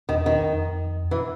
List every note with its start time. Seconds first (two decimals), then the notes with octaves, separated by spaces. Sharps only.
0.09 E2 D#3
0.26 D#3
0.39 E2
0.43 F2
1.11 E3